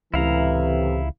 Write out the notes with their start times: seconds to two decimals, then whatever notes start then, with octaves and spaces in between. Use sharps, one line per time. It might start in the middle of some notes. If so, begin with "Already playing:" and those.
0.14 C#2 A2 C3 E3 E4 F5 A#5